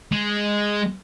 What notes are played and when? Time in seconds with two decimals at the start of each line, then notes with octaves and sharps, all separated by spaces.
0.12 G#3